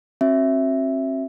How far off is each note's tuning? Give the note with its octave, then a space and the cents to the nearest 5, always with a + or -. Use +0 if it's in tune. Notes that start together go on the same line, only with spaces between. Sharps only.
C4 +45 F#4 +0 E5 +0